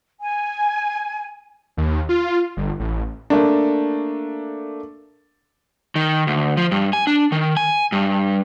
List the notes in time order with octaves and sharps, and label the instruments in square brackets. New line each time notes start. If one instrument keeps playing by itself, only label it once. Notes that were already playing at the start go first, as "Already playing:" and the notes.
[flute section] G#5
[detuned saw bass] D#2
F4
G1
A1
[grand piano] A3 A#3 D4
[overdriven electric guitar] D#3
D2
F3
G2
G#5
D4
D#3
G#5
G2